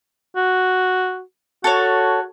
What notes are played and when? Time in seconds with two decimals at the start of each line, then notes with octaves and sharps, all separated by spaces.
0.36 F#4
1.64 F#4 A4 C#5